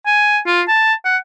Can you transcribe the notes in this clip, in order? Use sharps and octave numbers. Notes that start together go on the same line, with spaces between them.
G#5
F4
A5
F#5